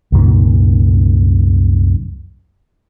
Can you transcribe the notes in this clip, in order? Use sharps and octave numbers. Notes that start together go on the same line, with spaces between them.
C2 F#2 A#2 D#3